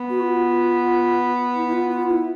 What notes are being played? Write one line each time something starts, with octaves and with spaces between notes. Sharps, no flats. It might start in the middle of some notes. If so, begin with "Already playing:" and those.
Already playing: B3
F#4
F4
E4
E4
F4
F4
E4